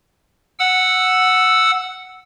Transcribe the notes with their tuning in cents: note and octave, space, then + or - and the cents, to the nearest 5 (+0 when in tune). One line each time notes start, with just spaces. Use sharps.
F#5 +0 E6 +0